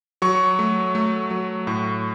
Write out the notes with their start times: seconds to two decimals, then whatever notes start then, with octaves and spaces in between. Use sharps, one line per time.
0.22 F#3 C#6
0.59 A3
0.95 A3
1.31 F#3
1.67 A2 C#6